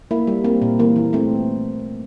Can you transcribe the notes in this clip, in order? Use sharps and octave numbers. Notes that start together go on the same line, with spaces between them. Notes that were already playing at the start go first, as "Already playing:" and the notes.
A#3 E4
G3
A#3 C4
A#2
E3 A#3
E3
A3 C4